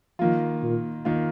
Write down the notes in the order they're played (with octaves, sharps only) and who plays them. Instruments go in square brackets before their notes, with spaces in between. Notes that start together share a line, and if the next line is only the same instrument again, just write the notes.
[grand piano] D#3 A#3 F4 [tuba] F3
[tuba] A#2
[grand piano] D#3 A#3 F4